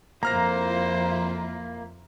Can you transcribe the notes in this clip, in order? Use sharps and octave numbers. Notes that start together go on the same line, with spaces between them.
F2 A#3 E4 F4 C5 A#5 F6 A#6